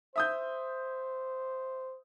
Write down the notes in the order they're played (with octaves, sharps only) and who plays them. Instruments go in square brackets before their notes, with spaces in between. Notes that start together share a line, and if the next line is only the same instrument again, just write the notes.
[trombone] C5 [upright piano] E5 D#6 G6